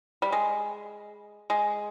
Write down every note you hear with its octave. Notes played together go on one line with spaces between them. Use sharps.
G3
G#3
G#3